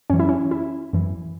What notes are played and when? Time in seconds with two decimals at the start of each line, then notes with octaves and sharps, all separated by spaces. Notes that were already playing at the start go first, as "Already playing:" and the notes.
0.10 F#2 E3 C#4
0.20 E4
0.29 C#4
0.51 E4
0.93 F#2 E3